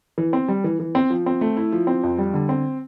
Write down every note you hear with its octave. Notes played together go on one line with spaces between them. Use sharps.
E3
C4
G3
E3
E3
C4
F3
C4
A3
E4
F3
C4
F2
G3
D3
C4